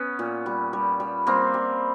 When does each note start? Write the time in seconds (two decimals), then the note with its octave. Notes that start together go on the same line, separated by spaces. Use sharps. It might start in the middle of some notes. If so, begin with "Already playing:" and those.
Already playing: B3 C#4
0.19 A#2
0.46 G3
0.73 G3
1.00 G3
1.27 G3 A#3 C4
1.54 G3